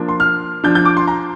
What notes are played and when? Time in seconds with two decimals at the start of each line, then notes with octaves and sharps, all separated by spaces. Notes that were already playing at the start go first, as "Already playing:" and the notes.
Already playing: F3 A#3 D4
0.08 C6
0.20 F6
0.64 F3 D4 G6
0.75 G6
0.85 D6
0.97 C6
1.08 A#5